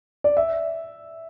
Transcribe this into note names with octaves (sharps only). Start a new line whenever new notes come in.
D5
E5